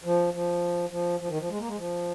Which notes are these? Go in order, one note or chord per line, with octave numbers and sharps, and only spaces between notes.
F3
F3
F3
F3
D#3
F3
G#3
A#3
G#3
F3